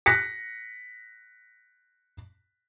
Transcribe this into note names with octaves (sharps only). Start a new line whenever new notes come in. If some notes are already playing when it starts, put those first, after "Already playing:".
F#6 A#6 B6 C#7